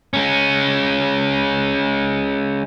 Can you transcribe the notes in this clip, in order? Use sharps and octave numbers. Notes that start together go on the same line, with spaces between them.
G#3 C#4